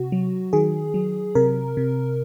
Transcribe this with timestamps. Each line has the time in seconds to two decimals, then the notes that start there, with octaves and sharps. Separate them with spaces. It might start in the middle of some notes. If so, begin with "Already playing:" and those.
Already playing: C3 F#4
0.12 F#3
0.53 D#3 G#4
0.94 F#3
1.35 C3 A#4
1.77 C3